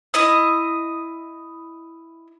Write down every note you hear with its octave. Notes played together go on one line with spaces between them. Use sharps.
E4 D#5 D#6